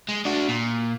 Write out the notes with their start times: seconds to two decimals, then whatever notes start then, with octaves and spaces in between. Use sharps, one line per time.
0.09 G#3
0.25 D4 F#4
0.49 A#2